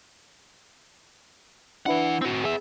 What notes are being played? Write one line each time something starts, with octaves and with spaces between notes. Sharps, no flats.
E3 D4 E4 B4 F#5
C4 F#4
B3 G#4 E5